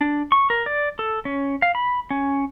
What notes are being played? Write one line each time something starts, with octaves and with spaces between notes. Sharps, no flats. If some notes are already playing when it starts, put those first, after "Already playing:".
D4
C#6
A#4
D5
A4
C#4
F5
B5
C#4